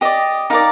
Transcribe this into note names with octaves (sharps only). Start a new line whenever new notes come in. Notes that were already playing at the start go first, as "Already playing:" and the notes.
G4 D5 D#5
D#4 A#4 D5 F5